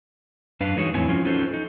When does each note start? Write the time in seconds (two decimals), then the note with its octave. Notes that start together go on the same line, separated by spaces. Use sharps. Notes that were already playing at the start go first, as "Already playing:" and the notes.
0.60 F#2 D4 B4 F5
0.76 E3 G#3 D#4 F#4 G#4 C#5
0.94 E2 A2 C4 E4 C#5 G#5
1.08 F3 C#4 F4
1.25 C#4 D#4 F4 F#4 A4 C5
1.53 D#4